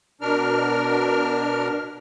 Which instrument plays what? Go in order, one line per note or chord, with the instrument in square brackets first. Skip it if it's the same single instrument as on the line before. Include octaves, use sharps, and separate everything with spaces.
[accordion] B2 D4 A#4 F6